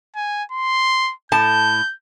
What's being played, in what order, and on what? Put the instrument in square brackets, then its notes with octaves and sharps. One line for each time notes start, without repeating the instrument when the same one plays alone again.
[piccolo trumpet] G#5
C6
[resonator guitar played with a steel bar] A2 A5 [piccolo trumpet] G6